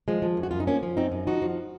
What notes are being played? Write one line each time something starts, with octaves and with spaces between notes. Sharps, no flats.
F3 G#3
F3
F#2
F#4
F#2 F4
D#4
F3 A#3 C#4
F3
F#2 C4 D#4
F#2
F3 D#4 F#4
F3